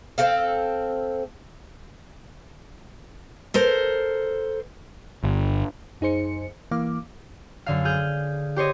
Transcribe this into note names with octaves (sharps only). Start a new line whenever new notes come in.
C4 A4 F5
A4 A#4 C5
G1
F#2 D#4 G#4 C5 C#7
E3 A#3 F5 D6
F#2 D3 F5
G#4 F6 G6
G4 C5 C#5 D#5